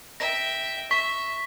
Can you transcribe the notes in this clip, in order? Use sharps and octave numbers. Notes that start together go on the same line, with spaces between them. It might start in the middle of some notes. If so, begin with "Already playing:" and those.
E5 G5 A#6
E5 C#6 B6